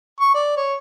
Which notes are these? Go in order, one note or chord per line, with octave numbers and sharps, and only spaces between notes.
C#6
D5
C#5